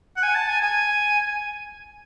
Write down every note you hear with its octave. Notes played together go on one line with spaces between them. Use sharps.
F#5
G#5
A5
G#5
G#5